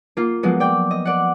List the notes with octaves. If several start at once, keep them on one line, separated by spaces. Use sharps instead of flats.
A#3 F4
F3 F#3 G#3 B3
D5 G5
D#5
D5 F#5